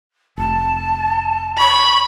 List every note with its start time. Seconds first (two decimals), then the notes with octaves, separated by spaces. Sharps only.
0.38 F1 A5
1.58 B5 C#6